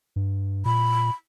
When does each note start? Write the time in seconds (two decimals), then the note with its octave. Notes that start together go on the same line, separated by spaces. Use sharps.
0.16 G2
0.65 A#2 B5